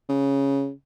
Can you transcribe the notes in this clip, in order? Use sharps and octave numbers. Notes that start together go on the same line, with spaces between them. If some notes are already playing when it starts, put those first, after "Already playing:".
C#3